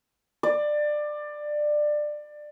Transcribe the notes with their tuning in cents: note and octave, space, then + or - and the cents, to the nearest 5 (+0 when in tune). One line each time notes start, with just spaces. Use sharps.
D5 +20